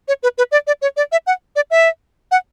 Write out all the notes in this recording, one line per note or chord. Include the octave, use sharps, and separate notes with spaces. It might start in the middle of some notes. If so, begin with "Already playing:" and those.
C#5
B4
B4
D5
D5
C#5
D5
E5
F#5
D5
E5
F#5